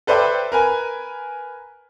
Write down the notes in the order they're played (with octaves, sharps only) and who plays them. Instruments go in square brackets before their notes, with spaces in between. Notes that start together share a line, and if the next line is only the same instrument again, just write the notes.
[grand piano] A4 B4 C5 D5 E5 G5
A#4 B4 G#5